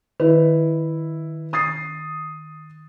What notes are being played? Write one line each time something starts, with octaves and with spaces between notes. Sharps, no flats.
D#3 E4 B4
D#6 A6 C7